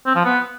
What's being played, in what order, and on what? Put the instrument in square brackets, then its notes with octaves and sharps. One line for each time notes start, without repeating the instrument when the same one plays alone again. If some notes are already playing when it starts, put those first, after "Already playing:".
[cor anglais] C4
F3
B3